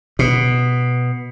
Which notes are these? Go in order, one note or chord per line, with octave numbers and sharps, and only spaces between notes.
B2